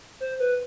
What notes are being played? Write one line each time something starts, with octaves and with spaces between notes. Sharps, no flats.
C5
B4